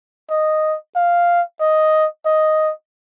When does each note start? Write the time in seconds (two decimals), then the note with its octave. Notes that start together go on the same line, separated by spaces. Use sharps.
0.30 D#5
0.96 F5
1.60 D#5
2.26 D#5